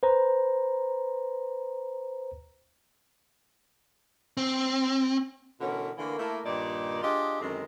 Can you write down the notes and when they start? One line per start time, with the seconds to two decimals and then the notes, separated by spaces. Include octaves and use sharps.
0.03 B4 C5 A#5
4.37 C4
5.61 B2 D3 E3 C#4 F#4 A#4
5.98 D3 E3 A3 A#3
6.19 A3 A#3 E4
6.46 G2 A#2 D#3 D#4 D5
7.02 D4 F4 G4 G#4 D#5
7.41 F#2 D3 D#3 G#3 C4